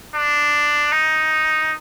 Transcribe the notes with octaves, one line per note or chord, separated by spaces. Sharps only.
D4
D#4